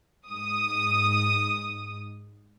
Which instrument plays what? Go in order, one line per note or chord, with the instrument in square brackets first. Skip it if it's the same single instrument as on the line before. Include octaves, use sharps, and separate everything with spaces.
[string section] G#2 D#6